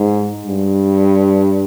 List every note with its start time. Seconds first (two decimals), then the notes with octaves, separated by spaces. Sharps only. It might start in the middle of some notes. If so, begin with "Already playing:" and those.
Already playing: G#2
0.46 G2